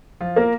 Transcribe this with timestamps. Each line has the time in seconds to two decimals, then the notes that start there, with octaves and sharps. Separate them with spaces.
0.21 F3 F4
0.36 A#3 A#4